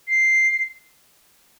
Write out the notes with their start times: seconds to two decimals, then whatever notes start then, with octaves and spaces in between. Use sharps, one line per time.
0.07 C7